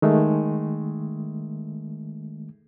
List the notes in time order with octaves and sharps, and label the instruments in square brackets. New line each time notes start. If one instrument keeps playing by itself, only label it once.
[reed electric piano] D#3 G#3 A3